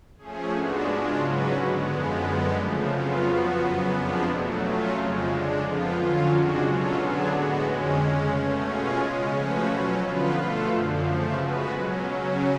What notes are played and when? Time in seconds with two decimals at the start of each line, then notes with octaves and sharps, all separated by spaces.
0.17 F3 A3 C#4 G#4
0.51 G#2 G#3 B3 D4 F#4
0.85 C#3 G#3 D4 F4
1.18 G#2 F#3 C#4 F#4 B4
1.53 D3 G#3 B3
1.87 F#2 F3 G#3 B3
2.20 F#2 D3 G#3 B3
2.54 C#3 F3 A3
2.88 F2 C#3 F#3 B3 F4
3.21 F3 B3 F#4
3.55 F#2 C#3 F#3 B3
3.89 F2 F3 G#3 B3 D4
4.23 B2 F#3 A3
4.57 F#3 A3 C#4 F4
4.91 F2 C#3 F3 G#3
5.25 D3 G#3 D4
5.58 F2 F3 B3 F4
5.92 D3 F#3 C#4 F4
6.26 F2 C#3 G#3 D4 F#4
6.60 B2 F#3 C#4 F4 A4
6.93 D3 F#3 B3 D4 G#4
7.27 A2 G#3 B3 F#4
7.62 F2 D3 G#3 C#4
7.95 C#3 G#3 C#4
8.29 B2 A3 C#4
8.62 B2 G#3 C#4 F4 G#4
8.97 C#3 G#3 C#4
9.31 F3 A3 C#4 F#4 B4
9.64 B2 F#3 C#4
9.98 D3 F3 B3 F4 B4
10.32 B2 A3 F4 A4
10.66 F#2 D3 F3
10.99 C#3 F3 A3
11.34 G#3 B3 F#4 B4
11.68 B2 F#3 C#4
12.01 C#3 F#3 C#4